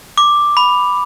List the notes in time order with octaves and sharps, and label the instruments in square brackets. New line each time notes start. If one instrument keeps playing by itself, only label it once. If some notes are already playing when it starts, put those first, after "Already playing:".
[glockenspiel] D6
B5